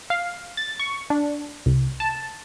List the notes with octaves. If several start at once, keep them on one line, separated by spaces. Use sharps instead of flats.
F5
A6
C#6
D4
C2
A5